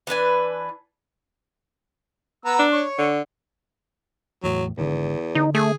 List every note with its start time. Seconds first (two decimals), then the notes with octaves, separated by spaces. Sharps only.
0.07 E3 D4 B4 G#5
2.45 B3 A#5 E6
2.59 D4
2.73 C#5 C#6
2.99 D3
4.43 E2 A2 F#3
4.78 G#1 E2 G#2 D3
5.35 D3 D#4
5.54 A3 G#4